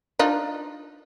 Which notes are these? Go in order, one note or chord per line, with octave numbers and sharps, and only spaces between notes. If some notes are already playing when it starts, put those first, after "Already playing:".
D4 D#4 F4